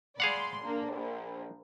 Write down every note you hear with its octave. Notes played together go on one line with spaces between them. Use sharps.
G#4 D5 F5 F#5 B5 C6
A#3 D4
A#1